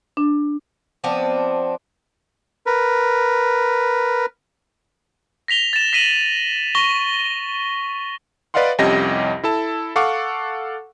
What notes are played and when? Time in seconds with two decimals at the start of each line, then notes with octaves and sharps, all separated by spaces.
0.17 D4
1.04 F3 B3 C4 D4
2.66 A#4 B4
5.48 A#6 B6 F7 G7
5.73 A6 E7
5.93 A#6 B6 D#7 E7 F#7
6.75 C#6 A#6 G7
8.54 B4 D5 D#5 F5 F#5 C6
8.78 C2 F2 C#4 G4 D#5 A#6
9.44 E4 A4 A5
9.96 A4 F5 F#5 C#6 D6